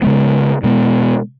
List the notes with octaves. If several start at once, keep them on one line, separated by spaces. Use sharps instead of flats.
C#3 G#3 B3
B2 G#3 B3